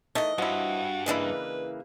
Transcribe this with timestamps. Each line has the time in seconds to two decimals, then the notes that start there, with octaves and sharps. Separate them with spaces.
0.15 D#3 E3 A3 D#5
0.38 G2 F3 E4 F#4
1.06 C#3 E3 G#3 A#3 D4 E4 B4